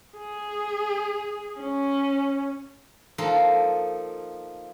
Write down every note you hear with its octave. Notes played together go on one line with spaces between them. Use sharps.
G#4
C#4
F3 A#3 D#4 A4